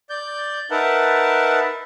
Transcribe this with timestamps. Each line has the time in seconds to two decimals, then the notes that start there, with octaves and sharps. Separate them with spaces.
0.10 D5 G6
0.71 D#4 A#4 B4 E5 F#5 A5